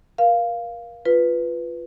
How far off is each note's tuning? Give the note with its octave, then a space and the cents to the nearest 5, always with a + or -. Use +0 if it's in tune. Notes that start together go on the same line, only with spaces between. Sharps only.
A#4 +35 F5 -5
F4 +0 B4 +0